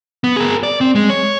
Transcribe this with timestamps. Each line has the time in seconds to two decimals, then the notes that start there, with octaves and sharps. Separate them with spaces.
0.24 B3
0.36 G#4 A#4
0.63 D5
0.81 C4
0.95 G#3
1.10 C#5